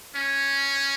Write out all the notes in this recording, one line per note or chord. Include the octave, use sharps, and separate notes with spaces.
C#4